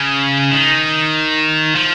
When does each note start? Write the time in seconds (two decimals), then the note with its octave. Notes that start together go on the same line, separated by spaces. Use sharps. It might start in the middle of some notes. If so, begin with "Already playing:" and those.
Already playing: C#3
0.51 D#3
1.75 F3